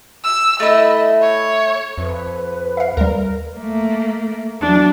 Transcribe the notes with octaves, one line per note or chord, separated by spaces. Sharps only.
E6
A3 E4 D#5
C#5
F2 B4
E5 F5
D#2 G3 A#4
A3 A#3
E2 F#3 D4